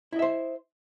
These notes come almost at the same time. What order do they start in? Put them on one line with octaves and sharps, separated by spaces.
E4 D#5 E5 C5